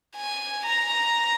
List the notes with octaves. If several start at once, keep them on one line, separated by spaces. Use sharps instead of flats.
G#5
A#5